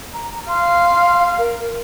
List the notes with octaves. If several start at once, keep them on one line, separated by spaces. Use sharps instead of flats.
A#5
F5 C6
A#4